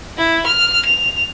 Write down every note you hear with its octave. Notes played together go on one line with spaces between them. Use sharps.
E4
F6
F7